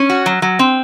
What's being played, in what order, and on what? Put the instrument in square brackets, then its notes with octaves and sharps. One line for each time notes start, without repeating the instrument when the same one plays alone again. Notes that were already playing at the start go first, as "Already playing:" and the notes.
Already playing: [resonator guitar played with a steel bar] C#4
F#4
F#3
F#3
C4